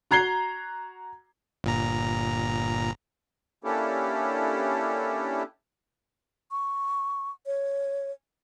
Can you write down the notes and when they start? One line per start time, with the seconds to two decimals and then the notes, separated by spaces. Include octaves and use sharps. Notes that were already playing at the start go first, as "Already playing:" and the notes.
0.11 F#4 A#5 G#6 C7 G7
1.64 G1 A#2 A#5
3.64 A#3 C#4 D4 E4 G4 A4
6.51 C#6
7.46 C#5